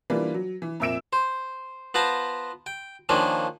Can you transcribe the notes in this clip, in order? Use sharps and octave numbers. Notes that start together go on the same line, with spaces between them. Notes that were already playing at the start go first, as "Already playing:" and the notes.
E3 G3 A#3 D4 F4 B4
F#3
E3
F2 A#2 E5 E6 D7 E7
C5
B3 F4 C5 A5 A#5
G5
D#3 F3 A#3 C#4 D4